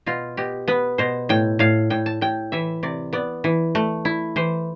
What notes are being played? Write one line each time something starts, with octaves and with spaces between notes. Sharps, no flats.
B2 F4
B2 G4
B3 B4
B2 C5
A2 G5
A2 F5
A2 G5
A5
A2 G5
E3 E5
C3 D5
B3 D5
E3
A3
E4
E3 C5